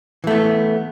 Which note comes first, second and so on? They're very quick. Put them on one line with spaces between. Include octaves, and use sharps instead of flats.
E3 A3 B3